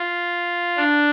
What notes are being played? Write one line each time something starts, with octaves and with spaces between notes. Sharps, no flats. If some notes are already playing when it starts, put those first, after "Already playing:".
Already playing: F4
D4